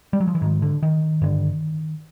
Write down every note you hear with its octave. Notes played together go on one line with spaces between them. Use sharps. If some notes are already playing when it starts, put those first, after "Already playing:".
G3
F#3
F3
E3
G#2 D#3
D3
D#3
G2 D3